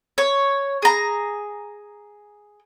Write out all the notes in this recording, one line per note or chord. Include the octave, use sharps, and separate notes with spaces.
C#5
G#4 A#5